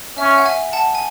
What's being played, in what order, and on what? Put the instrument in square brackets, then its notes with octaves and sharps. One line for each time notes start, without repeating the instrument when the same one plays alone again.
[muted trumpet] C#4 [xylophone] E5
[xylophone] E5
F#5
E5 G#5
F#5 A5
G#5